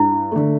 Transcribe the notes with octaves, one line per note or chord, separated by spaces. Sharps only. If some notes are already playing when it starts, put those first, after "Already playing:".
Already playing: G2 E4
D3 A3